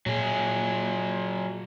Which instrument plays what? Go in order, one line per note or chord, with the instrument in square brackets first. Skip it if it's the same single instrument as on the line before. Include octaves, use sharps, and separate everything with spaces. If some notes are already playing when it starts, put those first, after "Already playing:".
[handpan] A#2 [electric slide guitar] F#3 G#4